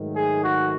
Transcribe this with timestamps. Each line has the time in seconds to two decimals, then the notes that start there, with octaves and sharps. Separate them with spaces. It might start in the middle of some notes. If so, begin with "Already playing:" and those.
Already playing: G#2 D#3 F#3 A3 D#4
0.16 G#4
0.44 F#4